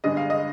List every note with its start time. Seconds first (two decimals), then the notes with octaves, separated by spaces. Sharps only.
0.04 G1 G2 D3 G#3 D#5
0.17 F5
0.30 D#5